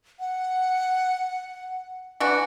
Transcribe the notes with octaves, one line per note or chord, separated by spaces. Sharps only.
F#5
E3 D4 F#4